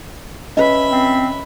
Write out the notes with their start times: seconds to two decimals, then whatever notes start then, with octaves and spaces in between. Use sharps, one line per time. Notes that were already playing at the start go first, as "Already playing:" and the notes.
0.57 C#4 B4 D#5 E5 B5
0.92 C4